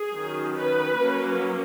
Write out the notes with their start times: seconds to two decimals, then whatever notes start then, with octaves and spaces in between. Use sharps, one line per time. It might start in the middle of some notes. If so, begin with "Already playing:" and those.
Already playing: G#4
0.12 D#3 F#3 C#4
0.56 B4
0.98 F#3 A#3 C#4